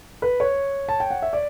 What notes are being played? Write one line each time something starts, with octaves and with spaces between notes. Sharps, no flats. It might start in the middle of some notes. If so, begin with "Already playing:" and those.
B4
C#5
A5
G5
F#5
E5
D5